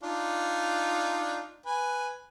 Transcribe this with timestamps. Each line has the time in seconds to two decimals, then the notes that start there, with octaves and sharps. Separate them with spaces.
0.03 D4 D#4 F4
1.66 B4 G#5